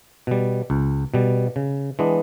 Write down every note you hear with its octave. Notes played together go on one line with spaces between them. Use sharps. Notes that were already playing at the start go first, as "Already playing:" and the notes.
B2 G3
C#2
B2 G3
C#3
E3 G#3 B3 D4